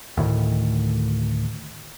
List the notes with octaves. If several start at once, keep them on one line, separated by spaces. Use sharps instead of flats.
D2 A2 D#3